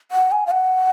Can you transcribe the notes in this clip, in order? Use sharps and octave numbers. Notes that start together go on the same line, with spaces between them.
F#5
G#5
F5
F#5